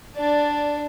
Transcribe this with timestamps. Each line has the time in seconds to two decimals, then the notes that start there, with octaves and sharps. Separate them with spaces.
0.16 D4 D5